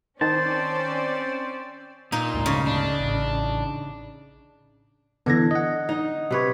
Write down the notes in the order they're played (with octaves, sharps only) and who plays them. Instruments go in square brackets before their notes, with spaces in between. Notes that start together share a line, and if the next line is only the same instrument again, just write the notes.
[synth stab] D#3 [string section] C4 C#4 D5 [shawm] C5 [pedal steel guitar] A5
[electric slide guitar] A#2 [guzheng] D#4
[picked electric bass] D2 G#2 A#3
[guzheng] C#3
[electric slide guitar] D4
[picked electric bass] A1
[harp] D3 G#6 A#6 [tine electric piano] E3 B3
[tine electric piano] D#5 F#5
[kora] D#4
C3 B4 C#5